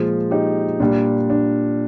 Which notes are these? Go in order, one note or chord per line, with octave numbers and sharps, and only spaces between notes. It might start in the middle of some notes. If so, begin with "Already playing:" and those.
Already playing: A#2 F3 G#3 F4 G#4
D#4 G4
A#2 G3 D4
D4